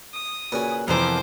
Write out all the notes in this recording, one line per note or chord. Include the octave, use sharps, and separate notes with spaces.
D#6
A#2 C#3 F#4 B4 G#5
F2 C3 E3 F3 B3 A#4 C5 D6